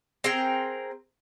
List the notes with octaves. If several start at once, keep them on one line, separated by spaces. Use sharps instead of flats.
C4 G#4 A#4 G5